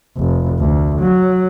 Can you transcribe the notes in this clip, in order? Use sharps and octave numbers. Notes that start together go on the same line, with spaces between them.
F1
D2
F#3